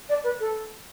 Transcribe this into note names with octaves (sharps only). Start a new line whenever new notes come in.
D5
B4
A4